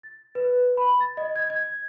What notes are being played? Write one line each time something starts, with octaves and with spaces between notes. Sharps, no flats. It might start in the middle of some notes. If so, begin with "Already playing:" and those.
A6
B4
B5
A6
D#5
G#6
G#6